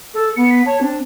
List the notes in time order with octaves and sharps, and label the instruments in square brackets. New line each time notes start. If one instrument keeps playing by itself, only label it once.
[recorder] A4
[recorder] B3 [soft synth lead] C#7
[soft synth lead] B6
[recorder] C#5 [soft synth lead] A5
[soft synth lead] C4 [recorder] D4